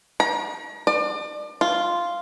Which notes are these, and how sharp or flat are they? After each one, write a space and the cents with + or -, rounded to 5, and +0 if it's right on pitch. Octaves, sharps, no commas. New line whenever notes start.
A#5 +40
D5 +35
F4 -5